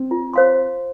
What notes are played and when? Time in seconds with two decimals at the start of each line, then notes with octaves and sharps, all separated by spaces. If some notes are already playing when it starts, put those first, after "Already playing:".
Already playing: C4
0.11 F4
0.34 C5 F5 C6